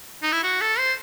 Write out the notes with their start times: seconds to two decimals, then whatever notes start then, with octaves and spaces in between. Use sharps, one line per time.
0.23 D#4
0.32 E4
0.43 F#4
0.61 A4
0.79 C5